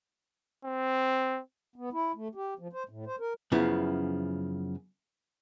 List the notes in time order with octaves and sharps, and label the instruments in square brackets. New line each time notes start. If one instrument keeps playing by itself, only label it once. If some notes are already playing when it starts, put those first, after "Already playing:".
[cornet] C4
[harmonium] B3
E4
A3
G4
F3
C5
A2
C5
A#4
[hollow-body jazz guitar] F#2 C#3 F3 B3 E4